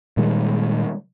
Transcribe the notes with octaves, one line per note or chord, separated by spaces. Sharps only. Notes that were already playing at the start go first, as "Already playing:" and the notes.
A#2 D#3 G3 G#3